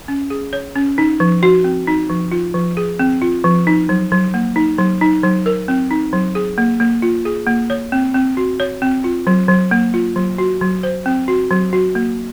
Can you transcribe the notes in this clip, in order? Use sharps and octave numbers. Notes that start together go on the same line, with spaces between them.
C#4
G#4
C#5
C#4
D#4
F3
F#4
C4
D#4
F3
F4
F3
G#4
C4
F4
F3
D#4
F#3
F#3
A#3
D#4
F#3
D#4
F#3
A#4
C4
D#4
F#3
G#4
A#3
A#3
F4
G#4
A#3
C#5
C4
C4
F#4
C#5
C4
F4
F#3
F#3
A#3
F4
F#3
F#4
F#3
C5
C4
F#4
F#3
F#4
A#3